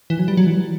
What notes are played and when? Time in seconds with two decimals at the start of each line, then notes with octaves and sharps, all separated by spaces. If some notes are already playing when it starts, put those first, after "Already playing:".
0.10 E3
0.19 F#3
0.28 G3
0.37 F#3
0.47 E3